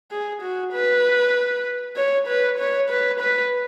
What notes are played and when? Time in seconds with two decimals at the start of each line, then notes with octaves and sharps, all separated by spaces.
0.11 G#4
0.42 F#4
0.72 B4
1.96 C#5
2.27 B4
2.58 C#5
2.90 B4
3.20 B4